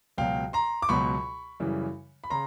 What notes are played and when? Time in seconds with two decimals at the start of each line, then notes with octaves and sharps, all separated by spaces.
0.18 C#2 B2 F#3 F5 G5
0.53 A#5 C6
0.82 D6
0.89 C#2 B2 F#3 B5 C#6
1.60 F#2 C#3 E3 G3
2.24 B5
2.30 C#3 A#5 C6